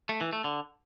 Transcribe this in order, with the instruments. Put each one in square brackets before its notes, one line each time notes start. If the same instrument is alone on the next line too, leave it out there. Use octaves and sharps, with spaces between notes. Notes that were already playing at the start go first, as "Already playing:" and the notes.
[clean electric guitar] A3
E3
A3
D3